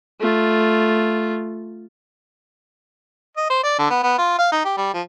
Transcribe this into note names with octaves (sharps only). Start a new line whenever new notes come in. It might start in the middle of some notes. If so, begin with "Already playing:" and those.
A3 F4
D#5
C5
D5
D3
B3
B3
F4
F5
D#4
G4
G3
F3